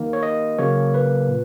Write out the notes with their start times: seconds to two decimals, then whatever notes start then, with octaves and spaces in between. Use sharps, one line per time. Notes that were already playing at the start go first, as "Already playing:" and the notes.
Already playing: D#3 A#3
0.13 C#5
0.23 D#5
0.58 C#3 F#3 A#3 C#5
0.94 B4
1.29 A#2